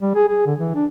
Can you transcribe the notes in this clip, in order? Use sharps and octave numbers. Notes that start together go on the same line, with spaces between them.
G3
G#4
G#4
D3
E3
D4